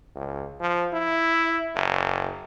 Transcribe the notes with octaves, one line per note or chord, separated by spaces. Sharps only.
C#2
F3
E4
F#1